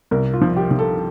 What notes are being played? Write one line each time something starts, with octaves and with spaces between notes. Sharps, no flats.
C2 A#4
F4
F3
G4
F3
A4